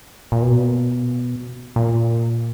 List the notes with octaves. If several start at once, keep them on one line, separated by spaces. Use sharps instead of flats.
A#2
B2
A#2